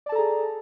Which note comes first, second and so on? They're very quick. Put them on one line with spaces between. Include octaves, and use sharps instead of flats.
D5 A5 A4 A#5 G#4